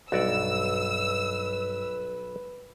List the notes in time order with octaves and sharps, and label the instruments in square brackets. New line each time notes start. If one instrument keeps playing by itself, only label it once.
[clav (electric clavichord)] B1 F#4 D5 [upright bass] G2 [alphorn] B4 [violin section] E6